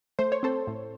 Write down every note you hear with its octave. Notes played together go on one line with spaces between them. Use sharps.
A3 C5
C#5
C4 A4 C5
A2